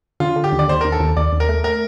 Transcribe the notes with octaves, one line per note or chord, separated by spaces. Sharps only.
D3 F4
D3
G4
D#2
D5
D#2 C5
D#2 A#4
A4
D#2
D#2 D5
D#2
A#4
A3
A#4